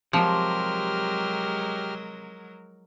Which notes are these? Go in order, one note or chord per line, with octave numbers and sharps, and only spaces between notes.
C3 F3 F#3 G#3 G4 A#4 F6